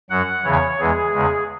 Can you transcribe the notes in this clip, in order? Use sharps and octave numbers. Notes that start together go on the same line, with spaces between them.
F#2 F#3 F#5
E2 C#3 E3 C#5
E2 E3 G#3 G#4
E2 C#3 G#3